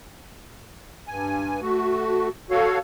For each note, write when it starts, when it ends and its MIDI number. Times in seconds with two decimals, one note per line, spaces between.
1.08 1.60 43
1.08 1.60 80
1.62 2.29 57
1.62 2.29 66
2.51 2.79 66
2.51 2.79 69
2.51 2.79 73
2.51 2.79 77